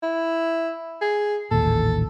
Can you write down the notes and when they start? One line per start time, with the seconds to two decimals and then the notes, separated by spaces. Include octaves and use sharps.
0.03 E4
1.02 G#4
1.51 A1 D#2 A#2 A4